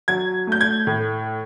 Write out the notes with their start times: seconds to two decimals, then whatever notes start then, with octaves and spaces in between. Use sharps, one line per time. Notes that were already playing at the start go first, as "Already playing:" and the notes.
0.08 F#3 G#6
0.47 A3 G6
0.61 G#6
0.87 A2